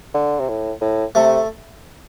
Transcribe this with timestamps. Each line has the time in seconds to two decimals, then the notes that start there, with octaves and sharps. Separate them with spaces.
0.14 D3
0.40 C3
0.48 A2
0.81 A2
1.15 C3 A3